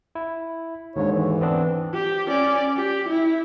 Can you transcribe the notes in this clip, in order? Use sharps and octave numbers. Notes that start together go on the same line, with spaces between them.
E4
D#2 G#2 D3 C#5
E3
B3 C4 D4
G4
C#4 D5
G4
E4